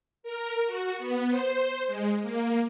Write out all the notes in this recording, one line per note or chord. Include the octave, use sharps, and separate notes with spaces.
A#4
F#4
B3
C5
G#3
A#3